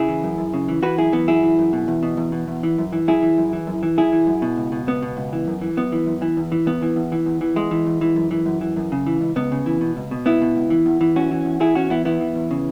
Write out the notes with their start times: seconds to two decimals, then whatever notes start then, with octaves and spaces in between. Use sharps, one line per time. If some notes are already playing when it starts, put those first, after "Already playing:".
Already playing: C#3 E4 G#4
0.08 E3
0.24 F#2
0.38 F#2
0.54 C#3
0.68 E3
0.83 E3 F#4 B4
0.98 F#2 E4 G#4
1.13 E3 B3
1.28 F#2 E4 G#4
1.43 E3
1.59 F#2
1.73 B2
1.88 E2
2.03 B2
2.17 E2
2.32 B2
2.48 E2
2.63 E3
2.78 F#2
2.93 E3
3.08 F#2 E4 G#4
3.22 E3
3.37 F#2
3.53 E3
3.67 F#2
3.83 E3
3.97 F#2 E4 G#4
4.12 E3
4.27 F#2
4.42 B2
4.58 C#2
4.72 B2
4.87 C#2 B3
5.02 B2
5.17 C#2
5.33 E3
5.47 F#2
5.61 E3
5.77 F#2 B3
5.92 E3
6.06 F#2
6.22 E3
6.37 E2
6.52 E3
6.66 E2 B3
6.82 E3
6.96 E2
7.12 E3
7.26 E2
7.41 E3
7.56 E2 G#3
7.71 E3
7.86 E2
8.01 E3
8.16 F#2
8.31 E3
8.46 F#2
8.61 E3
8.77 F#2
8.92 C#3
9.06 E3
9.21 C#2
9.36 C#2 B3
9.52 C#3
9.66 E3
9.81 B2
9.97 C#2
10.11 B2
10.26 C#2 B3 E4
10.42 B2
10.55 C#2
10.70 E3
10.86 E2
11.01 E3
11.15 E2 C#4 F#4
11.31 E3
11.45 E2
11.60 E3 E4 G#4
11.75 E2 C#4 F#4
11.90 E3 B3 E4
12.05 E2 B3 E4
12.21 E3
12.35 E2
12.51 C#3